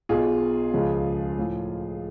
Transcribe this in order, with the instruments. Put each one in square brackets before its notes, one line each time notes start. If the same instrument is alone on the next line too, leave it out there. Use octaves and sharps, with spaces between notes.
[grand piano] B1 B2 F4 G#4
C#2 C#3 F3
A2 F3